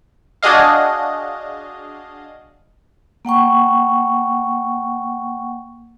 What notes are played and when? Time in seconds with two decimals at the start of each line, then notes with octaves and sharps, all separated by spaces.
0.43 D4 F#4 G#4 D#5 F5
3.25 A#3 F#5 G5 C#6